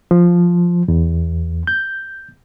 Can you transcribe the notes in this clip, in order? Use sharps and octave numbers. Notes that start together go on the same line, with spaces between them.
F3
E2
G6